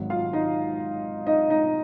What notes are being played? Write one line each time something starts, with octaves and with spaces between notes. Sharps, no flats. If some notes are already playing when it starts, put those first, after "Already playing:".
Already playing: G#1 G#2 F#3
F4 F5
D#4 D#5
D#4 D#5
D#4 D#5